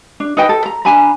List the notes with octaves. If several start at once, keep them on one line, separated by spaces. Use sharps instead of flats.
D4
D#4 B4 D#5 G5
A4
A#5
D4 G#5 A#5 B5